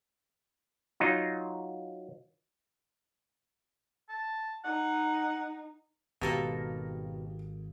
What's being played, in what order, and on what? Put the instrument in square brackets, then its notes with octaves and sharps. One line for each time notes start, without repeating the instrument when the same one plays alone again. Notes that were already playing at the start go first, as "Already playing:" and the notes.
[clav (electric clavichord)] F#3 D#4 F4
[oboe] A5
[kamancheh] D#4 [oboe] F#5
[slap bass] G#1 [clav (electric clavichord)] B2 [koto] A#3 A4 A#4 [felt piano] G4